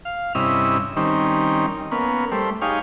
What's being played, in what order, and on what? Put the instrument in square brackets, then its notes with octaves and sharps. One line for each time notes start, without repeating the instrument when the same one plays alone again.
[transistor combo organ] F5
G2 C3 C#4 E4 D#5 E6
D#3 G3 C4 C#4 D#4
A#3 B3 C#4
G3 A3 C5
D#4 G4 G#4 C#5 F5